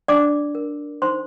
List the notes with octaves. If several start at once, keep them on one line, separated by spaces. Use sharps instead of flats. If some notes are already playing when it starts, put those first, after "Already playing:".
D4 D5 D6
A#4
D#4 C5 C6